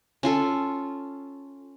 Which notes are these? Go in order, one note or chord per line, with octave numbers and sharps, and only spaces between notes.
C#4 F4 A4